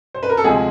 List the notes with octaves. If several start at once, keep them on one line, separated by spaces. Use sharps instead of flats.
C5
B4
A#4
A4
D2 C3 F3 G#3 G#4